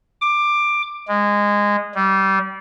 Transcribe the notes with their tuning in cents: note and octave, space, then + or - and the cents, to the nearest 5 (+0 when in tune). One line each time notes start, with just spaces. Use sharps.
D6 +15
G#3 -15
G3 -25